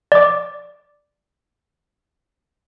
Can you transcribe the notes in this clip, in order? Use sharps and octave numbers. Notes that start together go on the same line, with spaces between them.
D5 D6